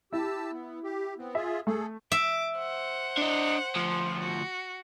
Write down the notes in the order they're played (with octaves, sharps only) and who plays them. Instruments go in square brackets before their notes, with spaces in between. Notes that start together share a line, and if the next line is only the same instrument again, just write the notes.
[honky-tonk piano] E4 [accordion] G4 A5 E6
[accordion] B3
G4
B3 C4
[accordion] F4 G#4 [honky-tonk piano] E5
[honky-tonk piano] A3 [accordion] G#4 A4
[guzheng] E5 [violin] D6
[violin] C5 F#5
[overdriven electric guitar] D4 D#5
D2 F3
[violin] F#4